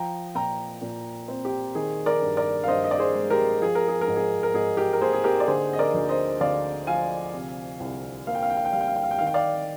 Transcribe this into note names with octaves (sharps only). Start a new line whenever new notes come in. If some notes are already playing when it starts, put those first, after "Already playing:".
Already playing: F3 G5 A#5
A#2 G5 A#5
A#2
C4
G4
D#3 G#4
A#4 D5
G2
A#4 D5
F5
G2 C5 D#5
D#5
D5
G#4 C5
G#3
G4 A#4
F3 G#4
A#4
G#4
A#4
G#2
G#4
A#4
G#2 G#4
G4 A#4
A#4
A#3 G#4 C5
G#4
G4 A#4
D5
D3 G#4 C5
D#5
A#4 D5
D2
C5 D#5
D2 D5 F5
F3 F5 G#5
C3
C2
A#3 F5
G5
F5
G5
F5
G5
G3 F5
G5
F5
G5
F5
G5
D#3 F5
G5
D5 F5